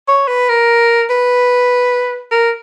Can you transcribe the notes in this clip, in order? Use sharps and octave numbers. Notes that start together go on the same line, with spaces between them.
C#5
B4
A#4
B4
A#4